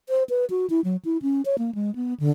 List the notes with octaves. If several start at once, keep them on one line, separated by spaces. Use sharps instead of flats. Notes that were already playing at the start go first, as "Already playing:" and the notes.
C5
B4
F#4
E4
F#3
E4
C#4
C#5
A#3
G#3
B3
D3